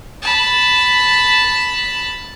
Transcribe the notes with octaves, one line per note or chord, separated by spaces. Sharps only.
A5 B5